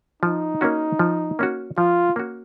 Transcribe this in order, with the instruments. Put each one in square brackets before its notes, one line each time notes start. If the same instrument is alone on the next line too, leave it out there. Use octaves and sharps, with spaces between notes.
[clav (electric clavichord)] F3 [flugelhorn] D#4
[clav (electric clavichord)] A#3 C#4 F#4
F3
A#3 C#4 F#4
[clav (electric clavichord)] F3 [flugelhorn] F4
[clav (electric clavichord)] A#3 C#4 F#4